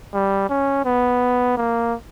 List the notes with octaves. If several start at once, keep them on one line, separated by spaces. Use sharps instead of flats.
G3
C#4
B3
A#3